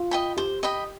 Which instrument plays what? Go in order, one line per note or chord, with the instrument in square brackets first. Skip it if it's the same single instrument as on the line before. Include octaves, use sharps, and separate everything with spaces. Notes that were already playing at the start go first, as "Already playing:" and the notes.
Already playing: [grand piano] F4
[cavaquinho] D#5 G5 B5
[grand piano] G4 [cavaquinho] C5
[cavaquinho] D#5 G5 B5